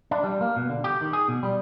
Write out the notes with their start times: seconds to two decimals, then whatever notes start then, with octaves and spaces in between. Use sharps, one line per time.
0.11 D4
0.24 G3
0.41 A#3
0.56 B2
0.69 D3
0.84 G4
1.01 D#3
1.13 G#4
1.28 B2
1.43 G3